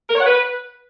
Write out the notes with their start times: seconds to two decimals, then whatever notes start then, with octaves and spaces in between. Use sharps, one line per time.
0.09 A#4
0.15 C#5
0.20 F#5
0.26 B4